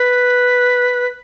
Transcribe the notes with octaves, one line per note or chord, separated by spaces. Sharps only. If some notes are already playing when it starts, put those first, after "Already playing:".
Already playing: B4